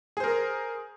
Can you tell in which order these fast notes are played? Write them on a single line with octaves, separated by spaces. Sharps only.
G#4 C5 A#4